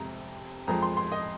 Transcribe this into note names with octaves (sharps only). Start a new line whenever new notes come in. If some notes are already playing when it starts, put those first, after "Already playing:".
Already playing: F2 C3 G#3 A#5
F2 F3 G#3 A#5
C6
C6
D#5